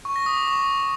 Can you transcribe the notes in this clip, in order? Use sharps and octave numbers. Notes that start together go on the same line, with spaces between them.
C#6
A#6
D#6
D6
C#6